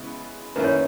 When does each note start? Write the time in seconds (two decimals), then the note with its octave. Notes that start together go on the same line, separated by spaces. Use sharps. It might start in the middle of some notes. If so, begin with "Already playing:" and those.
Already playing: C#3 G#3 B3 E4
0.56 F#2 D#3 A#3 C#4 E4 B4
0.64 C#5